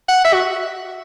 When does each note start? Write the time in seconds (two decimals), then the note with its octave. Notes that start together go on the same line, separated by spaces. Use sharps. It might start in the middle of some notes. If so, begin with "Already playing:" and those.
0.09 F#5
0.24 E5
0.34 F#4